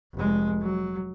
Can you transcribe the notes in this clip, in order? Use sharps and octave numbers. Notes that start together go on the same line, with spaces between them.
F1 G#3
F#3